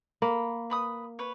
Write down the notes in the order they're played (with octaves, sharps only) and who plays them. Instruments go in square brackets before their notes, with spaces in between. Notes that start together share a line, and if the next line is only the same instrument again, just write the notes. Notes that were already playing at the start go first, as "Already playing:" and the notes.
[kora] A#3 [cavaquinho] B5
[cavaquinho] B4 B5 D#6
B4 C#5